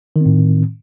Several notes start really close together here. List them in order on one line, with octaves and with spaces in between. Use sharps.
D#3 C4 A2